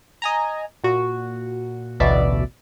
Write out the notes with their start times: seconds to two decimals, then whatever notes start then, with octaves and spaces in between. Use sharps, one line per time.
0.22 D#5 G#5 A#5
0.84 A#2 F#4
2.00 A1 D2 B2 D5 E5